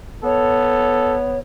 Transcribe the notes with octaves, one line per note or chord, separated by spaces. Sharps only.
B3 A4 C#5